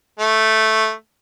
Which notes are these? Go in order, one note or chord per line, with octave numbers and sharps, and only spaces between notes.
A3